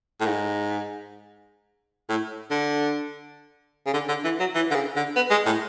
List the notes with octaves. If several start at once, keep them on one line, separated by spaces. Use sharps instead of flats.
A2
G#2
A2
D3
C#3
D3
D3
E3
F#3
E3
D3
C#3
D3
B3
G#3
A2